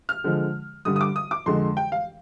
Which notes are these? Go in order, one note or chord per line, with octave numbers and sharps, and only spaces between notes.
F6
D3 F3 G#3
G2 D3 G3 D#6
D#6
D6
D#6
D6
F2 D3 G#3 C6
G5
F5